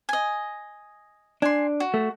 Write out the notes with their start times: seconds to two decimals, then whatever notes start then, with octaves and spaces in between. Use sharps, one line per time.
0.09 D#5 G#5
1.42 D4 G#5 C6
1.80 F#4
1.94 A3